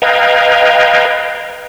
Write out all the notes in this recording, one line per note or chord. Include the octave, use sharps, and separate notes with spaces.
B4 D#5 F5 G5 A#5 G#6